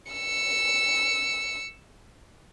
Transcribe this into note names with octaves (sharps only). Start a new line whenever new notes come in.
E6 C#7